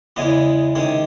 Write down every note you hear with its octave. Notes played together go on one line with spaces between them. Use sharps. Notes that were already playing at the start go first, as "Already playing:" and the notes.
E2 C#3 E3 G#3 B3
C3 D#3 G#3 C#4